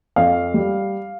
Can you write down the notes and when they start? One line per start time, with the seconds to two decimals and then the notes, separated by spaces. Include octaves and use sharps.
0.16 F2 F5
0.54 G3